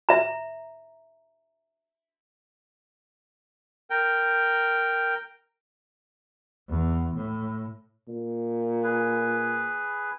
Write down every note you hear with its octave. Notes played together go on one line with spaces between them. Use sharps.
E5 A#5
A#4 G5
E2
A2
A#2
G#4 B4